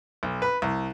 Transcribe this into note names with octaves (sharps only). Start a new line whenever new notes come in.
B1
B4
C2